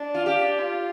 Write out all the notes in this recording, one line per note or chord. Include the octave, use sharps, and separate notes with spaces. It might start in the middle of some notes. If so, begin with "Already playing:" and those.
Already playing: D4
F4
G4
F4